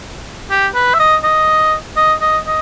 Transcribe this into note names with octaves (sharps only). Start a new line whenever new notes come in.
G4
B4
E5
D#5
D#5
D#5
D#5
D#5